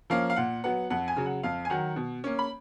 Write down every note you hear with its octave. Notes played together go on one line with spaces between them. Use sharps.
F3 A#3 C#4 F5
F5
A#2 F#5
F#3 B3 F#5
F2 F#5
G#5
C#3 F#3
F#5
F2 F5
G#5
D#3 F#3 F#5
B2
A#3 C#4
B5